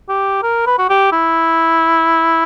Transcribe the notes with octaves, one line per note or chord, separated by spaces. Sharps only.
G4
A#4
B4
F#4
G4
E4